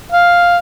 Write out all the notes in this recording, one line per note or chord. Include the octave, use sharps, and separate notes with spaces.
F5